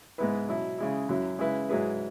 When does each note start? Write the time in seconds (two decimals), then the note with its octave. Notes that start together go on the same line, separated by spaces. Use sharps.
0.18 G#2 G#3 B3 E4 B4
0.49 B2 F#3 E4
0.78 C#3 G#3 E4
1.09 F#2 F#3 E4
1.39 C#3 G#3 E4 B4
1.69 G#2 F#3 E4 G#4 B4